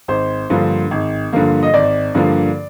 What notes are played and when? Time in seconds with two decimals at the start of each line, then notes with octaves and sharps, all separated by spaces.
0.08 G#1 C5
0.50 G2 D3 F3 A#3
0.91 G#1
1.33 G2 D3 F3 A#3
1.63 D#5
1.74 G#1 D5
2.15 G2 D3 F3 A#3